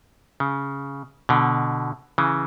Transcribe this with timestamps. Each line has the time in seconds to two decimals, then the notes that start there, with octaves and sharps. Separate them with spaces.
0.40 C#3
1.29 B2 D3
2.18 C#3 E3